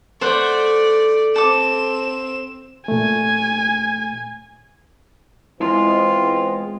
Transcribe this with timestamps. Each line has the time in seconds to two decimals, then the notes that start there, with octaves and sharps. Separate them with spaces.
0.21 A3 C5 D5 F#5
1.36 C4 A4 D6 E7
2.88 A#2 A3 G#5
5.60 E3 G#3 B3 C4 E4 F4